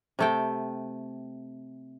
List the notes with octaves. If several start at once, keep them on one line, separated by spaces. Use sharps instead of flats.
C3 A3 G5